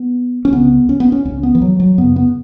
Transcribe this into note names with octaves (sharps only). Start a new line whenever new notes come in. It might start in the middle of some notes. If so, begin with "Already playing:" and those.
Already playing: B3
C#4
C#2 C#3 B3
C#4
B3
C#4
C#2 C#3 C#4
B3
E3
F#3
F#3
F#2 C#3 B3
B3